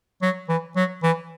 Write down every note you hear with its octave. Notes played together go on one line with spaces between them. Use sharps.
F#3
E3
F#3
E3